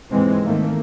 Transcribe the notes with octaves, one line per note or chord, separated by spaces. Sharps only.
D#2 G#2 E3 G#3 C4
G#2 D#3 E3 A3 A#3